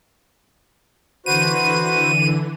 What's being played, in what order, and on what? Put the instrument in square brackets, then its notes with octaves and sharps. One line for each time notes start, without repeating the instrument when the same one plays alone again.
[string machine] D3 E3 [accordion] F#4 B4 C5 [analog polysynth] D#7